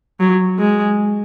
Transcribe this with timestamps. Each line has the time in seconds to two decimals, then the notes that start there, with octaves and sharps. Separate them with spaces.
0.20 F#3
0.59 G#3